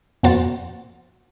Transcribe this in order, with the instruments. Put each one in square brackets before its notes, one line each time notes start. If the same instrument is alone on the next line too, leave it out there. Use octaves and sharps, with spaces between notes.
[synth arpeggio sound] F2 B2 A#3 F#4 C5 A6